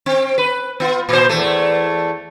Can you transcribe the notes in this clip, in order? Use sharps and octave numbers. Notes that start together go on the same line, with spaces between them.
C4
B4
B3 F4
A#2 C5
E2 A3